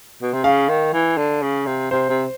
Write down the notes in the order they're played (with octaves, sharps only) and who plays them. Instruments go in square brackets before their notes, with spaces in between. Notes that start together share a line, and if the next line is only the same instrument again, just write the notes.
[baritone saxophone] B2
C3
[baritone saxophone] C#3 [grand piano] F5
[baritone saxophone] D#3
E3
D3
C#3
C3
[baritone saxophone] C3 [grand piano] C5
[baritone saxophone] C3